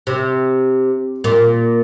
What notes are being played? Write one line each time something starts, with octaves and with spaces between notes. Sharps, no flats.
C3
A#2